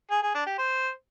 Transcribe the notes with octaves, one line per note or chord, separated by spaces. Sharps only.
G#4
G#4
D4
G4
C5